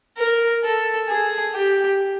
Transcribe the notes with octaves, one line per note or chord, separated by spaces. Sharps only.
A#4
A4
G#4
G4